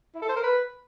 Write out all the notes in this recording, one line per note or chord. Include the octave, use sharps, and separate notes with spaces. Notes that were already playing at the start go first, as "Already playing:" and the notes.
E4
A4
C5
A#4
B4